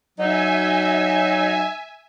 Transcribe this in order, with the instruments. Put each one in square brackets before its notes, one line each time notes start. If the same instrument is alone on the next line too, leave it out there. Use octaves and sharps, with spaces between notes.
[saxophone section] F#3 D#4 [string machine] E5 G#5